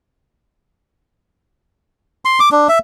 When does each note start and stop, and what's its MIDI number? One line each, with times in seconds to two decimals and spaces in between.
2.25 2.39 84
2.40 2.49 86
2.52 2.67 62
2.69 2.79 76